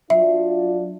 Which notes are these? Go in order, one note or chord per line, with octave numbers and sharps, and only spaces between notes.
F#3 D4 F4 E5